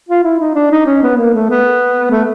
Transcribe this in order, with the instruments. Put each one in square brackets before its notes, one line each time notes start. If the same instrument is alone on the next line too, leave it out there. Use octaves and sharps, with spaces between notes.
[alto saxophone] F4
E4
D#4
D4
D#4
C#4
B3
A#3
A3
B3
A3